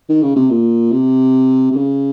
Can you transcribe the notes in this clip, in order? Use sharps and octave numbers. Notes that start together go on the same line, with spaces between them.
D#3
C#3
C3
A#2
C3
C3
C#3